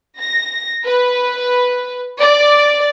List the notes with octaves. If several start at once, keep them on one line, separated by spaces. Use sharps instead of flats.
A#6
B4
D5